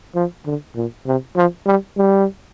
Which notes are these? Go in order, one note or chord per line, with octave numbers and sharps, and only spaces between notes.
F3
D3
A#2
C3
F3
G3
G3